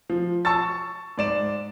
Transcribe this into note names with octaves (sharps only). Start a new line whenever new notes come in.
F3
A5 C#6 E6 A6
G#2 D5 E7